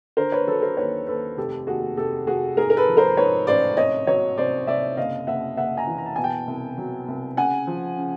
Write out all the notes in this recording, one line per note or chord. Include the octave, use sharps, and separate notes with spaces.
D3 A#4 C5
B4 C#5
F#3 A4 B4
A#4 C5
D#2 B4 C#5
D#2 A4 B4
F1 G4 A4
D#2 F#4 G#4
F1 G4 A4
F1 F#4 G#4
G#2 G#4 A#4
A#4
A4 B4
F3
A#4 C5
G#2 B4 C#5
A1 C5 D5
C2 C#5 D#5
F#3 C#5 D#5
C2 C5 D5
C2 D5 E5
F#1 D#5 F5
F#1 E5 F#5
F#1 E5 F#5
G#5 A#5
E3
A#5
A5
B2 G#5
G5 A5
C2
F#3
C2
C#3 F#5 G#5
F3
C#3